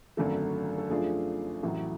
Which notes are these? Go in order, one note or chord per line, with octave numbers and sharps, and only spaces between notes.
G#1 F#2 D3 F#3 A3 A4
A4
F#2 F3 A3 D4 F4 G#4
A1 A2 F#3